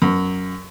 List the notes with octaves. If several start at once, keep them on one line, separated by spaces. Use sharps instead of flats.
F#2